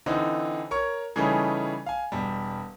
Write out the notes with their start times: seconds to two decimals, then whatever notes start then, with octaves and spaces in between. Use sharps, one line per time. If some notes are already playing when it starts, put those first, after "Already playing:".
0.06 D3 E3 C4 D#4
0.71 A#4 C#5 C#6
1.16 C#3 E3 G3 A3 C#4 D#4
1.86 F5 G#5
2.12 E1 G3